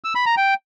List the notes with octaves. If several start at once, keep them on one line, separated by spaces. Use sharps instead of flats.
E6
B5
A#5
G5